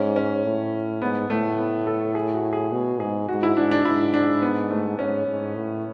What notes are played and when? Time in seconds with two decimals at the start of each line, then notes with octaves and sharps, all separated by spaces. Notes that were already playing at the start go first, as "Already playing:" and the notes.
Already playing: G#2 C#4
0.16 C#4
0.44 A2
1.02 G#2 B3
1.30 A2 A3
1.58 B3
1.87 A4
2.15 G#4
2.34 F#4
2.53 G#4
2.72 B2
3.00 G#2 G#4
3.28 G#2 F#4
3.43 E4
3.56 G#2 D4
3.71 D4
3.85 G#2 E4
4.14 D4
4.42 B3
4.71 A3
4.99 G#2 C#4
5.28 G#2
5.55 A2